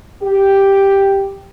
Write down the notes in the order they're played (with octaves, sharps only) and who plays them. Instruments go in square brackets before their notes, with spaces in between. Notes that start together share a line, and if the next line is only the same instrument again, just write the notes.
[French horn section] G4